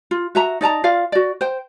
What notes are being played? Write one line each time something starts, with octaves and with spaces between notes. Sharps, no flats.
F4
F#4 E5 A#5
D#4 D5 A5 A#5
F4 D5 F5
F#4 D5
C5 G5